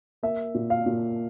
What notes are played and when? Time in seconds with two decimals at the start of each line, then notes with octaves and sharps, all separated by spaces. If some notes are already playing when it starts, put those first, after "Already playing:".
0.23 A#3 E5
0.55 A#2
0.70 F5
0.86 A#2